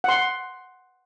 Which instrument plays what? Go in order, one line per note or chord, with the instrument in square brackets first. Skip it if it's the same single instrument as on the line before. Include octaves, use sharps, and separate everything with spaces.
[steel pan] F#5 C6